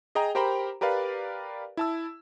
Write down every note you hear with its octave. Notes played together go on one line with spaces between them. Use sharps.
G#4 D#5 G5 A#5
G4 A#4 C5 G5 A#5 B5
G4 A#4 B4 D5 F5
E4 A5 E6